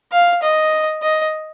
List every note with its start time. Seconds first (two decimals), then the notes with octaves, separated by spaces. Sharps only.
0.12 F5
0.43 D#5
1.03 D#5